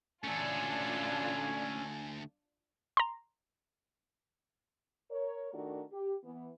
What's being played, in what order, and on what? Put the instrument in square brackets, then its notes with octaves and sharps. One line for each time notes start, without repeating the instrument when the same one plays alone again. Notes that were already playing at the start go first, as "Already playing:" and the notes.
[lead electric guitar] D2 A3 [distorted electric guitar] C#4 A4 [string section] D4 F4 [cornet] G#5
[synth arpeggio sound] A#5 C6
[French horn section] A#4 C#5
D#3 A3 D4 F#4 A#4 D5
G4
E3 B3